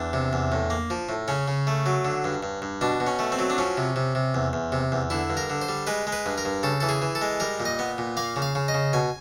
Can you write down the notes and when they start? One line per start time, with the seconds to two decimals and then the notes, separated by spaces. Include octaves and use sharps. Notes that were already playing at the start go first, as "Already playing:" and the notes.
Already playing: E2 D4
0.13 C3
0.33 E2
0.52 A2
0.70 A#3
0.90 F3
1.09 A2
1.28 C#3 C#4
1.48 C#3
1.67 A3
1.86 F#3
2.05 D3
2.24 G2
2.43 G2
2.62 G2
2.81 B2 D4
3.00 B2
3.07 C#4
3.19 A3
3.32 C4
3.39 F#3
3.50 D4
3.58 F3 C#4
3.77 C3
3.96 C3
4.15 C3
4.35 E2
4.53 E2
4.72 C3
4.92 E2
5.10 D3 E4
5.30 G2
5.37 A#4
5.50 D3
5.62 C5
5.69 G3
5.87 G#3 B4
6.07 G#3
6.12 B4
6.26 G2
6.38 A#4
6.45 G2
6.63 C#3 A4
6.80 E3 A4
6.89 G#4
7.02 E3
7.15 A4
7.21 G#3
7.40 G3 A#4
7.60 A#2
7.65 D#5
7.79 B3
7.98 A#2
8.17 A#3 F5
8.36 C#3
8.42 F5
8.55 C#3
8.68 D#5
8.74 C#3
8.93 B2 G#5